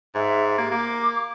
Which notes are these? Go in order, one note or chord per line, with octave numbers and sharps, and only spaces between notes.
G#2 E5
A#3 G4
A#3 D6